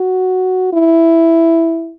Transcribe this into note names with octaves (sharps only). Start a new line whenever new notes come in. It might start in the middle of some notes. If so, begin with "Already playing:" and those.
Already playing: F#4
E4